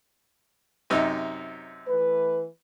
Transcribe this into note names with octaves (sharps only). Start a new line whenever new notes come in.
F#2 C3 D#4
E3 A3 B4